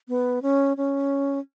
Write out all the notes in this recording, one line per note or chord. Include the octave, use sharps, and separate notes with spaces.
B3
C#4
C#4